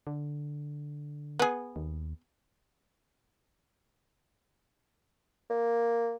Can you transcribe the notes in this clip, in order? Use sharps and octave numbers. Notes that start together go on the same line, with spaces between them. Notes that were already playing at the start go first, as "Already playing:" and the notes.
D3
B3 G#4
D#2
A#3